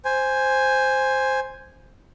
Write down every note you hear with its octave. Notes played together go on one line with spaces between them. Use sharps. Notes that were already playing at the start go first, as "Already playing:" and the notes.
C5 G#5